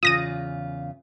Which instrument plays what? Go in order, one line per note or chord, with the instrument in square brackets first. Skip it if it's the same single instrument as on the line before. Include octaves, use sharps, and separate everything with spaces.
[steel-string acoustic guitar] E2 C#3 F4 [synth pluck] D#6 A#6 D#7